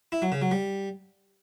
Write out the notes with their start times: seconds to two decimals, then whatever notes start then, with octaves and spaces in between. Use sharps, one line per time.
0.12 E4
0.22 F#3
0.32 C#3
0.42 F#3
0.51 G3